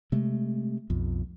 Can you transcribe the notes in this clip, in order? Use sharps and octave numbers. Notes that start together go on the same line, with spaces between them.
C3 G#3 A3
B1 F2